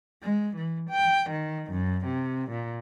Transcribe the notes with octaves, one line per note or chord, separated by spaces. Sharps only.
G#3
E3
G5
D#3
F#2
C3
A#2